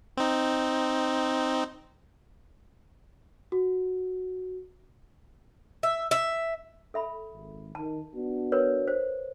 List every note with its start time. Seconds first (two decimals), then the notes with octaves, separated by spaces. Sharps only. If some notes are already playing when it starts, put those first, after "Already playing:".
0.17 C4 D#4
3.52 F#4
5.83 E5
6.11 E5
6.94 A4 E5 B5
7.32 G#1
7.75 D#3 A5
8.15 B3 D4 F#4
8.52 A#4 B4 C#5
8.88 C5